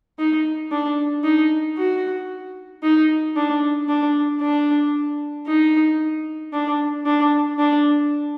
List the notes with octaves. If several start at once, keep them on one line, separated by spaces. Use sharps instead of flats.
D#4
D4
D#4
F#4
D#4
D4
D4
D4
D#4
D4
D4
D4